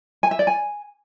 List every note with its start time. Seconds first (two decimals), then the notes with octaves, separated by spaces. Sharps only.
0.23 G#5
0.31 E5
0.39 D5
0.47 G#5